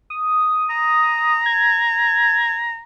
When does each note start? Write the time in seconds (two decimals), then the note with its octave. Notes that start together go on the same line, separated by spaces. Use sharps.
0.10 D#6
0.70 A#5
1.46 G#6